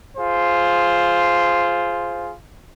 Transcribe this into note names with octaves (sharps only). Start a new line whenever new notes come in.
F4 G#4 C5